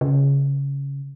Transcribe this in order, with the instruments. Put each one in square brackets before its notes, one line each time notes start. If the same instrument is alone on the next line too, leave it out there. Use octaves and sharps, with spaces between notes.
[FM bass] C#3